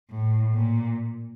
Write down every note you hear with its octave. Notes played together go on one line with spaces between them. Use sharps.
A2
A#2